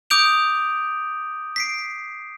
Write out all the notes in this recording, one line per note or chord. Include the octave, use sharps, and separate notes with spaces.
D6 D#6 G6 D7 F7
B6 C7 D7